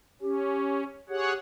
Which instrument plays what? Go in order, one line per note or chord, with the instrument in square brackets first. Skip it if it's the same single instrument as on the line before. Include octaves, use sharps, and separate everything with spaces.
[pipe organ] C#4 [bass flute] G4
[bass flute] G4 [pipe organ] G#4 C#5 F#5